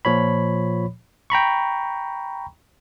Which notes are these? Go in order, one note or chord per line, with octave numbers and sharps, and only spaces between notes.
A#2 F3 C#5 B5
G5 A#5 B5 C#6